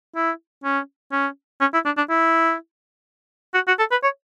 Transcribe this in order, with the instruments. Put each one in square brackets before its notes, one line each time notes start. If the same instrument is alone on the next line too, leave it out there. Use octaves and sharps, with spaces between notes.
[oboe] E4
C#4
C#4
C#4
E4
D4
D4
E4
F#4
F#4
A4
B4
C#5